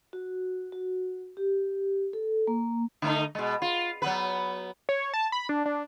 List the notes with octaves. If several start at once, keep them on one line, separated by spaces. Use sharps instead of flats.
F#4
F#4
G4
A4
A#3
D3 A3 D#4
B2 G#3
F4
F#3 B3 B4
C#5
A5
B5
D4
D4